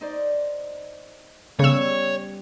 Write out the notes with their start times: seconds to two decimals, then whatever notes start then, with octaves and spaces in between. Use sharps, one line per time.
0.01 D#4 C5 D5
1.59 C#3 G3 B3 C#4 C#5 E6